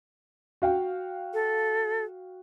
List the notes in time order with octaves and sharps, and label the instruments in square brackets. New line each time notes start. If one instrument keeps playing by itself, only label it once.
[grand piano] F#4 F5 G5
[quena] A4